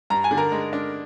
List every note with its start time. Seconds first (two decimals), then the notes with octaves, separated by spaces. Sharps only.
0.10 G2 A#5
0.24 G#5
0.31 D3
0.37 A#4 A#5
0.52 G#3
0.73 D4